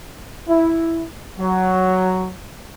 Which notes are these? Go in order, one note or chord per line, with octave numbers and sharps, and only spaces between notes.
E4
F#3